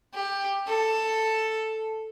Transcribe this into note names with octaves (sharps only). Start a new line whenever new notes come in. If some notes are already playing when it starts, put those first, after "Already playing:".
G4
A4